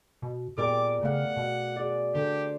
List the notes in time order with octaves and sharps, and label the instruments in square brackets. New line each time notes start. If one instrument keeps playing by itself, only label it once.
[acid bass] B2
[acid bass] A#2 [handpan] B3 G4 G#4 [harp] A#4 D5 A#5 [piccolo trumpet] D6
[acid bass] C#3 [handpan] A3 F5 [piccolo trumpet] F#5
[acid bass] B2
[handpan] F#4 G#4 [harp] D5
[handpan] D3 A4 [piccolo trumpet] G4 [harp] C5